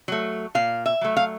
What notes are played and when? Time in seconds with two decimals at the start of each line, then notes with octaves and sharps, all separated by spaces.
0.08 F#3 A3
0.55 A#2 F5
0.86 E5
1.01 F#3 A3
1.17 F5